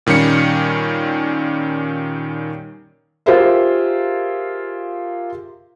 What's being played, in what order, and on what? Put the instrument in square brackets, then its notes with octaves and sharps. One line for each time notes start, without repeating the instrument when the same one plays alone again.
[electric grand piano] A#2 D#3 G3 C#4 C#7
[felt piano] F4 G4 G#4 A#4 C5 E5